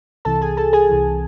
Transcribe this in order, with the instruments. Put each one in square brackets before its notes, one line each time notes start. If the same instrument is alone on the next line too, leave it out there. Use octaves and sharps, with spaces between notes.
[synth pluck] C2 C3 E3 A4 A5
G#4 G#5
A4 A5
G#4 G#5
C2 C3 E3